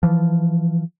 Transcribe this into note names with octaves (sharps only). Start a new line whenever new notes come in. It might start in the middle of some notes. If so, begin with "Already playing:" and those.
E3 F3